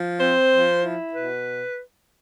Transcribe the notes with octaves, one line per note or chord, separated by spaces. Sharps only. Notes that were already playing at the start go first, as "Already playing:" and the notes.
Already playing: F3
C4 C5
F3
E4
B2 B4